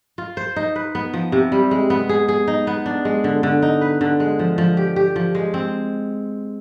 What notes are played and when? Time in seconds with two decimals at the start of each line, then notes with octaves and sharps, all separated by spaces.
0.18 F4
0.37 C5
0.56 D#4
0.76 B4
0.95 B3
1.14 F3
1.32 C3
1.52 G3
1.71 G#3
1.90 B3
2.09 G#4
2.28 G#4
2.48 D#4
2.67 B3
2.86 D4
3.05 G#3
3.24 D3
3.43 D3
3.62 D#4
3.81 B4
4.01 D3
4.20 G#3
4.39 F3
4.58 F3
4.77 G4
4.96 G4
5.16 F3
5.35 G#3
5.54 C4